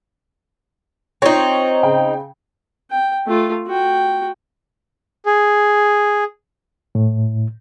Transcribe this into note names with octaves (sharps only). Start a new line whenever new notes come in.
C4 D#4 F4 C#5
C#3 G5
G5
A3 F4
F#4 G5
G#4
A2